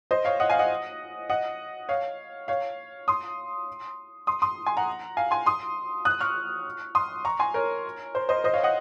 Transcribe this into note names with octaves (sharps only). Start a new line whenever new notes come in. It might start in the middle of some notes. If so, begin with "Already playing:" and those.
C5 D#5
C#5 F5
D#5 F#5
F5 G#5
D#5 F#5
D#5 F#5
C#5 F5
C#5 F5
C6 D#6
C6 D#6
C6 D#6
G#5 C6
F#5 A#5
F5 G#5
G#5 C6
C6 D#6
D#6 F#6
C#6 F6
C6 D#6
A#5 C#6
G#5 C6
A#4 C#5
C5
C5 D#5
C5 D#5
C#5 F5
D#5 F#5